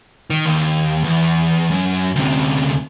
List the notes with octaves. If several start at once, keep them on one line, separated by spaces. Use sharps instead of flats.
D#3
D#2
E2
F#2
D2 C3